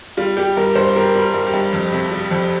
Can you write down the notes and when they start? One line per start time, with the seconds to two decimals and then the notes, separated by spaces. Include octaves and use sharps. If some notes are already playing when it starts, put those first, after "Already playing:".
0.17 G3 F4
0.37 G3 G4
0.57 G2 A#4
0.75 G2 C5
0.96 G3 A#4
1.15 G3
1.21 A#4
1.34 G2
1.47 G4
1.54 G2
1.73 F2
1.92 C3
2.12 G3
2.31 F2